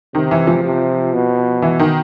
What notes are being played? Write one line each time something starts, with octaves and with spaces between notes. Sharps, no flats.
C3 D#3
E3
F3
C3
B2
E3
D#3